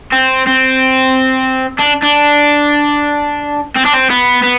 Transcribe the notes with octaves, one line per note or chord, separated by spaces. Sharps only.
C4
C4
D4
D4
C4
D4
C4
B3
B3